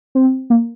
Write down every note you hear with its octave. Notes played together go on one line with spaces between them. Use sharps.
C4
A#3